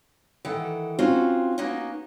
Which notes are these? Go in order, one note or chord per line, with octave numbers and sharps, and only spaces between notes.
D#3 E3 A4 F#5 G5
C4 C#4 D#4 F4 F#4 C5
A#3 B3 C#4 D#4 F#4